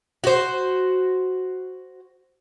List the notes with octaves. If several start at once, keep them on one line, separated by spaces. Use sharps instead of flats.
F#4 C5